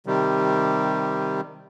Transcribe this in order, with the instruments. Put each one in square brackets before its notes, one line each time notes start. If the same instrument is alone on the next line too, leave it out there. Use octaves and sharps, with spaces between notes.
[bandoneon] C3 D#3 G3